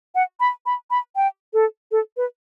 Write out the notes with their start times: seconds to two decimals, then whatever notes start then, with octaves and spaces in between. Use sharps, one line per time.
0.15 F#5
0.40 B5
0.66 B5
0.91 B5
1.16 G5
1.54 A4
1.92 A4
2.17 B4